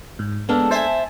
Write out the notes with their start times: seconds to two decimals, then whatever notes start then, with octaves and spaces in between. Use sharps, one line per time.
0.19 G#2
0.49 G#3 A#3 B3 D4 A4
0.71 C5 E5 G#5 A5